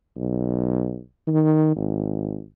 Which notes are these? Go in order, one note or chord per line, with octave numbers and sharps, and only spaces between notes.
B1
D#3
G#1